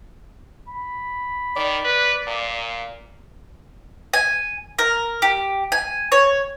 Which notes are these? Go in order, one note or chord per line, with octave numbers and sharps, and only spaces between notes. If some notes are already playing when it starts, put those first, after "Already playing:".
B5
D#3 D5
B4
A#2
G#5
A#4
G4
G#5
C#5